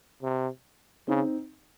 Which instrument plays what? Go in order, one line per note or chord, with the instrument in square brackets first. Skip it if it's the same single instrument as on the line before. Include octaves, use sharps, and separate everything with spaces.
[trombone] C3
[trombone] C#3 [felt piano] C4 D#4